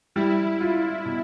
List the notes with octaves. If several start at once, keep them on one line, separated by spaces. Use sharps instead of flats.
G3 E4
F4
B2